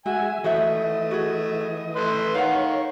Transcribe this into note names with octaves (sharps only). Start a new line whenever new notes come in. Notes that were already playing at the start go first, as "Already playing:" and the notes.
G#3 F#4 E5 G#5
E3 A3 F#4 C5 D#5 E5
F#4 G#4
A3 B4 C6
D#3 C#5 F5 F#5